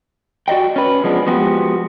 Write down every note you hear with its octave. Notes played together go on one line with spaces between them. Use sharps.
F#4 D5 D#5 G5
C#4 B4
F3 G#3 B3 D4
F3 G#3 B3 F#4 G4